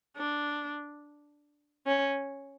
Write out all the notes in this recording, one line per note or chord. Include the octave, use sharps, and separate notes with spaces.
D4
C#4